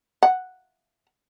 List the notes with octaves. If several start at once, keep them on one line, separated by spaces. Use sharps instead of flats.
F#5